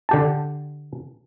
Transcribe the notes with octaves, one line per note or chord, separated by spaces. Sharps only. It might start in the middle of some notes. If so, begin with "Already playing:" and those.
D3 G4 A5